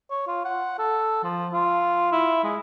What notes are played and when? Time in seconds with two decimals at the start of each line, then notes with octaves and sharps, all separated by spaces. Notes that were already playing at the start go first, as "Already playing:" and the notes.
0.11 C#5
0.27 F4
0.45 F#5
0.79 A4
1.23 F3
1.53 F4
2.12 E4
2.44 G#3